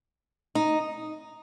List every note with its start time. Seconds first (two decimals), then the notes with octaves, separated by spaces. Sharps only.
0.55 D#4